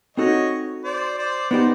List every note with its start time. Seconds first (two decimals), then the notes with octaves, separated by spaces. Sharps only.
0.17 C4 D#4 F#4 A4 C#5 D#5
0.84 C5 D5
1.18 C5 D5
1.51 B3 D#4 G4 C5 D5